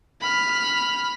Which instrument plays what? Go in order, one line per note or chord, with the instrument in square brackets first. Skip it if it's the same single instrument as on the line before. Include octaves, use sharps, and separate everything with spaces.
[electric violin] B5 F6